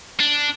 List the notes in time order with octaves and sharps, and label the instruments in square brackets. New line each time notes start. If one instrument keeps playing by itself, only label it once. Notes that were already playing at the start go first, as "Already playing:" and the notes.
[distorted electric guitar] D4